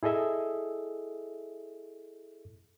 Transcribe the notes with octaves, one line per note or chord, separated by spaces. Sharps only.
E4 G#4 A4 D#5 E5